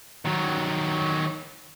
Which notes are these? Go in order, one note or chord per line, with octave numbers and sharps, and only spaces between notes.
D#3 F#3